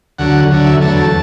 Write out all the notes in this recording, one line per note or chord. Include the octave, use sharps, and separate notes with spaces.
D2 D3 F#3 F#5
D2 D3 F#3
E5
E2 D3 F#3 A3 A5
A5